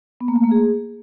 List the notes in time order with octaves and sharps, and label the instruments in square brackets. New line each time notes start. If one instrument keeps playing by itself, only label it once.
[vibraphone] B3
A#3
A3
A#3
G#4